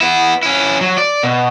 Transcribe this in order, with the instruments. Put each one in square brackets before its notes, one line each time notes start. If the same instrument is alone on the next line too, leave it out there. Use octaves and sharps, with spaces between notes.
[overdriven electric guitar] B3 E4
C#4 E4
F#3
D5
B2